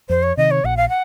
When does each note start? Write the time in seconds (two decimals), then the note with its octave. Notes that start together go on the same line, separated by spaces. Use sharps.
0.09 F2 C5
0.23 C#5
0.37 C3 D#3 D#5
0.51 C#5
0.64 A#1 F#5
0.77 F5
0.89 F#5